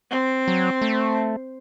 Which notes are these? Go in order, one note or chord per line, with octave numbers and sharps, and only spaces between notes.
C4
F#3
A3